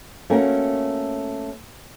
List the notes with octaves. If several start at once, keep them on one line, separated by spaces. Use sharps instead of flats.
A3 A#3 C#4 F#4 A#4